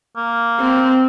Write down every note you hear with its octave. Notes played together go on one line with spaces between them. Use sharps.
A#3
C4